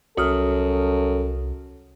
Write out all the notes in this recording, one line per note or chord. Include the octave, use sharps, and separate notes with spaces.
C2 F#2 F#4 A4 D#6 F6